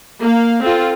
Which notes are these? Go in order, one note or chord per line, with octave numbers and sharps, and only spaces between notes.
A#3 F5
C4 F4 A4